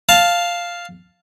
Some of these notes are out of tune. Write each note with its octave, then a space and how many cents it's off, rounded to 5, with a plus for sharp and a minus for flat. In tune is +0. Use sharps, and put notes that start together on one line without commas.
F5 +0 A5 +0